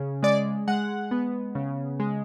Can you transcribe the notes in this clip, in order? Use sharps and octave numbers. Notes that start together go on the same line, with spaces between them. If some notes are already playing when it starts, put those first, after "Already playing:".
Already playing: C#3
G#3 D5
G#3 F#5
B3
C#3
G#3